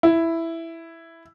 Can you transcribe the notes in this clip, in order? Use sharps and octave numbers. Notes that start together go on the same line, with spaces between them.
E4